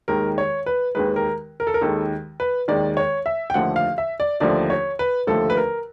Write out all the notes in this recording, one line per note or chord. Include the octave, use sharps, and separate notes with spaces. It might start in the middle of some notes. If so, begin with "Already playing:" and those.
D#2 D#3 G#3 A#4
C#5
B4
D#2 D#3 G#3 B4
A#4
A#4
A4
A#4
D#2 D#3 G#3 A4
B4
D#2 D#3 G#3 D5
C#5
E5
G5
D#2 D3 F3 A3 F#5
F5
E5
D5
D#2 D3 F3 A3 D5
C#5
B4
D#2 D3 F3 A3 A4
B4
A#4